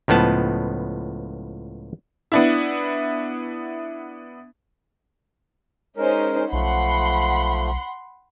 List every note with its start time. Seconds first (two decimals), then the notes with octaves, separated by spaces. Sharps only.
0.08 C#2 A2 F3 B3 A5
2.32 B3 D4 E4
5.97 G#3 C#4 D#4 A#4 C5
6.52 B1 F3 A3 F#5 B5 C6